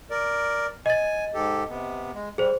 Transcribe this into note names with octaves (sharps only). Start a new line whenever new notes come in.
A#4 D5
D#5 G#5 A6
G#2 G4 A4
C3 B3
G#3
G3 G#4 C5